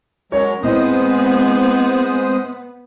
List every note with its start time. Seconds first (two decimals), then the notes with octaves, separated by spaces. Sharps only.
0.32 F#3 G#3 C#4 A#4 C#5
0.63 A2 G#3 B3 C4 C5 D#5 D#6